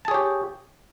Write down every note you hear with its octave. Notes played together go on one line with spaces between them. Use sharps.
G4 G#4 C#5 A5